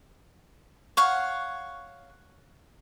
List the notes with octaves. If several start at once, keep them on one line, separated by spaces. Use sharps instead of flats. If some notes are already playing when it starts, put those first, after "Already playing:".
C#5 F5 F#5